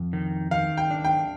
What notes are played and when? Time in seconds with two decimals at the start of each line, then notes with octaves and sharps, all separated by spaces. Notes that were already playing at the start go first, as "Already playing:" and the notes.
Already playing: F2
0.13 D#3
0.51 D#3 F5
0.77 G5
0.91 D4
1.04 G5